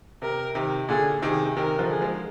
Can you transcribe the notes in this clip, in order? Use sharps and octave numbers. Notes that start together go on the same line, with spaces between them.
C3 A#4
C3 D#3
A#2 D3 G#4
C3 D#3 G#4
C3 D#3 A#4
D3 F3
G#4
F3 G#3